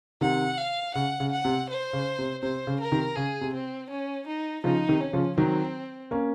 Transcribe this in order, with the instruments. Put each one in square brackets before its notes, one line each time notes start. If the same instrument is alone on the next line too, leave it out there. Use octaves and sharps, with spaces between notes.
[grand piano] C3 D#3 [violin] F#5
[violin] F5
[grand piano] C#3 [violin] F#5
[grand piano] C#3
[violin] F#5
[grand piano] C3
[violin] C5
[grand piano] C#3
C3
[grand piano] C3 [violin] C5
[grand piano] C#3
[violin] A#4
[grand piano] C3 D#3
[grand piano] C#3 [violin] G#4
[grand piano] C3
[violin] C4
C#4
D#4
[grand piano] C#3 F3 [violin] D#4
[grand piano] C3 D#3
[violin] C#4
[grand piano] C#3 F3
[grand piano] D#3 F#3 [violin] C4
[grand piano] A#3 C#4